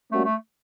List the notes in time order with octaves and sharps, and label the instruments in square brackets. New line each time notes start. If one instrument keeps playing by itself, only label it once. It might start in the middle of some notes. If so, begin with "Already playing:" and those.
[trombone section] G3 A#3 C#4 F#4 [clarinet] A3
[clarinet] A3